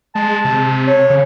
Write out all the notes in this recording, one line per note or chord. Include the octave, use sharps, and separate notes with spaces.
G#3 A5
C3
C#5
C#3